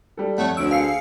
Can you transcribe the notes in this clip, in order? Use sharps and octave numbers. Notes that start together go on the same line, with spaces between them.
G3 A4
F2 A3 C#5 F#5
D2 E6 D7
G#4 F5 C7 C#7